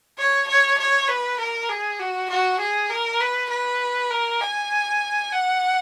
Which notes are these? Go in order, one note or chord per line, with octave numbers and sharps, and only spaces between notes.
C#5
C#5
C#5
B4
A#4
G#4
F#4
F#4
G#4
A#4
B4
B4
A#4
G#5
F#5